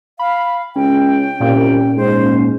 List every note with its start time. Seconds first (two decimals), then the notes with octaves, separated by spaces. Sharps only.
0.19 F5 B5
0.76 C#2 C#4 G5
1.40 C2 A#2
1.97 G#2 C5